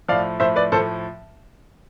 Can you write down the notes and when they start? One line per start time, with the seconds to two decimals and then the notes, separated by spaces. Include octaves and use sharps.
0.08 A2 F3 D5 F5
0.40 A2 F3 C5 E5
0.56 B4 D5
0.72 A2 F3 A4 C5